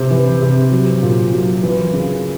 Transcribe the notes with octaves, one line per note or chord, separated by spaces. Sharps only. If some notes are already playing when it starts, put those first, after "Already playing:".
Already playing: C3 C5
E3
C3
F#3
A#2
F#3
E3
C#3